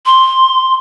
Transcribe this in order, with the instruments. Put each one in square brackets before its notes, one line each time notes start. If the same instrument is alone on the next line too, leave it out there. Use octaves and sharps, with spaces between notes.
[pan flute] C6